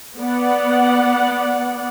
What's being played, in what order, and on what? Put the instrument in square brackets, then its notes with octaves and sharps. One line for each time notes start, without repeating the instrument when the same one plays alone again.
[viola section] B3 D5 F#5